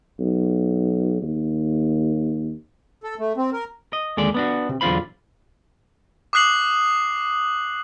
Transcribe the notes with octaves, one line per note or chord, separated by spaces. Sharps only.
B1
D#2
A4
A3
C4
A#4
D#5
D#2 D3 G#3 A4 D5
B3 D4 F#4
C3
B1 E2 D3 F4 C5 B5
D6 D#6 F#6 C7 F#7